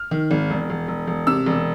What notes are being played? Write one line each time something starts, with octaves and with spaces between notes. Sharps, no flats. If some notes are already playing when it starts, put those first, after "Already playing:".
Already playing: F6
D#3
G#1
E1
E1
E1
E1
C3 E6
E1